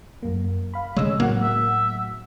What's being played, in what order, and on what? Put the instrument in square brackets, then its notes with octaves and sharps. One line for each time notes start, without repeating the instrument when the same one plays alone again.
[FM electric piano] F#2 A#3
F5 B5
[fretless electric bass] C#3 G#3 [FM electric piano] C#5 E6
[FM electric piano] A2 F#3 F#5 [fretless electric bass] A#3
[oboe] E5